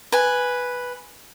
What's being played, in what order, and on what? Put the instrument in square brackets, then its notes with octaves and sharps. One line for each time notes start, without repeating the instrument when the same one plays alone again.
[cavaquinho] B4 G#5